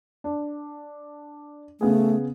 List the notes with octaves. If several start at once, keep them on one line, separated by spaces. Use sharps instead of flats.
D4
C#3 A3 B3 G#4